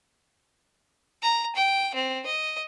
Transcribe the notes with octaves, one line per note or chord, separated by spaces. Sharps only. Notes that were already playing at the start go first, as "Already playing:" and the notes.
A#5
G5
C4
D#5